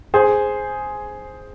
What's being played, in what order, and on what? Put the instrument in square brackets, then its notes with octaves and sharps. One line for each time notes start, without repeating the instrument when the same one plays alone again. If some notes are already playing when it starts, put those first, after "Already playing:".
[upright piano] G#4 C5